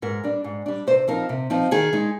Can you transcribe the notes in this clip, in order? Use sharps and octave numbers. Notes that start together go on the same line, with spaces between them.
G#2 A#4
G3 D4
G#2
G3 D4
C3 C5
F3 C4 D#4 A#4
C3
F3 C4 D#4
D#3 G#4
G#3 D#4